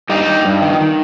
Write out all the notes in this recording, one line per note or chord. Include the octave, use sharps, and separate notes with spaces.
G2 D#4 G4
G2
G2
D#3
D#3